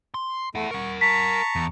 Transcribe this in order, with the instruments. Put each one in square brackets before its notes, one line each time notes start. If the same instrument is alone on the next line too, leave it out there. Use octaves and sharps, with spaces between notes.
[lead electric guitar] C6
[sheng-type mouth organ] A3 [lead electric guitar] E4 F#5
[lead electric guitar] A#4 F#5 [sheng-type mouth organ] C#6
[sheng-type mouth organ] A5 A#5 C#6 [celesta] B6
[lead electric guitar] E2